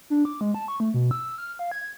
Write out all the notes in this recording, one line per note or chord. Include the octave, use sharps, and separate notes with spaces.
D4
D6
G#3
A5
C#6
A3
B2
E6
F6
F5
G#6